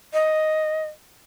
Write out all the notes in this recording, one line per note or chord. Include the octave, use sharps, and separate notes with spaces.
D#5